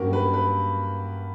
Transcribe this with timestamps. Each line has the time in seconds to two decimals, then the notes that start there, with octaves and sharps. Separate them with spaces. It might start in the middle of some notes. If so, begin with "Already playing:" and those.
Already playing: G2 F#3 A#3 C#4 F#4 G4 A#4
0.13 B4
0.34 B4